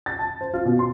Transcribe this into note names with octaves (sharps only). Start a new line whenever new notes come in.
A6
A5
C5
F4
B2
C6